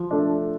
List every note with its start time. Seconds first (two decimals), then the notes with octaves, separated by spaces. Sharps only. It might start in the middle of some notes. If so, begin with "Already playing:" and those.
Already playing: F3
0.11 A3 D4